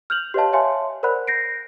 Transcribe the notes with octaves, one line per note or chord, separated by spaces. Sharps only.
F6 G6 F7 F#7
G4 B4 C#5 D#5 F5 A5
C#5 E5 F5 G#5 A5 C6
A#4 C5 D5 F#5 B5 F#6
G6 A#6 C7 D7